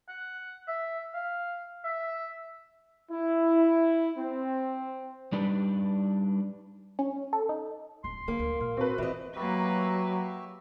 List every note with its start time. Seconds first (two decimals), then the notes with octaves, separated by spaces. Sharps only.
0.09 F#5
0.68 E5
1.14 F5
1.85 E5
3.11 E4
4.18 C4
5.32 G3 D4 D#4 G4 B4 D5
6.99 C#4
7.33 A4
7.49 D#4
8.04 D1 C6
8.28 D3 A#3
8.39 D2
8.60 A#2 F5
8.77 C4 F#4 B4
8.98 E3 F4 D#5
9.36 F#3 A#3 F#4 G4 B4 E5